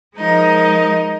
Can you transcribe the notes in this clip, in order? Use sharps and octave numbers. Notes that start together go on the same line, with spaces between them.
F3 G#3 D#4 A#4 D#5